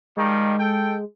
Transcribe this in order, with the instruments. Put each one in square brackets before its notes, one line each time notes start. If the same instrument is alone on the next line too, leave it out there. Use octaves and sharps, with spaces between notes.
[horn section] D#3 F3 G3 [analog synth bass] G#3
[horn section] A4 G5